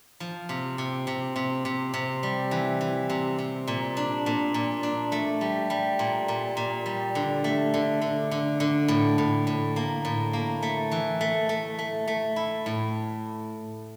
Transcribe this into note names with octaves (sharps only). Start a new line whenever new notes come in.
F3
C3
C3
C3
C3
C3
C3
G3
E3
E3
C3
C3
A#2
D4
A#2
A#2
D4
A3
G3
G3
A#2
A#2
A#2
G3
D3
A3
D3
D3
D3
D3
A2
A2
A2
A#3
A2
A#3
A3
E3
A3
A3
A3
A3
E4
A2